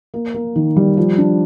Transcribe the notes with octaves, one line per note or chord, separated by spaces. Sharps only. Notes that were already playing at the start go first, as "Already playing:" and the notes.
A#3
A#3
D#3
G3
F3
D4